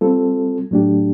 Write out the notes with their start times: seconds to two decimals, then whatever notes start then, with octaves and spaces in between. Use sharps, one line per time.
0.01 G3 C4 F4 A4
0.71 A2 F#3 A3 D4 G4